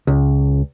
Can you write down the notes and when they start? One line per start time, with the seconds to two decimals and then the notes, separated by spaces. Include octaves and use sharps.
0.07 C#2